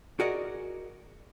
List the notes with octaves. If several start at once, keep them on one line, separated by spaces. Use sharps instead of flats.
F#4 G#4 A#4 D5 D#5 F#5